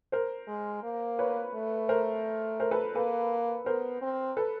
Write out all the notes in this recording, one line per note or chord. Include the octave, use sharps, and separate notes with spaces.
A#4 C5
G#3
A#3
B4 C#5
A3
A#4 C5
A#4 C5
A4 B4
A#3 A4 B4
B3 A#4 C5
C4
A4 B4